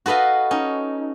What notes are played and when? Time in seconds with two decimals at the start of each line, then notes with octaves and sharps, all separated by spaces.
0.06 F#4 A4 B4 D#5 F5
0.51 C#4 D#4